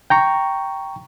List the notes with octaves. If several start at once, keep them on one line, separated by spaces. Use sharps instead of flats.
G5 A#5 C#6